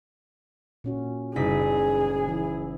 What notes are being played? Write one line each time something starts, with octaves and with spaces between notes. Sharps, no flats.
A#2 C#4 F#4
F#1 G3 D#4 E4 G#4 B6
E3 E4